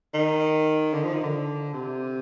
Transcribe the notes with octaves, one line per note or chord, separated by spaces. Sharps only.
D#3
D3
F3
D#3
D3
C3